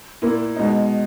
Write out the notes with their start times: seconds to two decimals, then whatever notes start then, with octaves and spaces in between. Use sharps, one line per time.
0.22 A#2 A#3 E4
0.56 B2 G#3 D#4